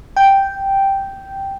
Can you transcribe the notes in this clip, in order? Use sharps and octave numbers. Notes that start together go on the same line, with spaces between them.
G5